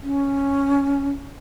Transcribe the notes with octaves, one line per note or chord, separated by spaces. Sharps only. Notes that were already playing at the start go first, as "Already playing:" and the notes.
C#4